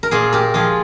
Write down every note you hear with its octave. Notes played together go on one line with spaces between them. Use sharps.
A#4
A#2 F4 G#4
G4 A#4
F3 G#3 F4 G#4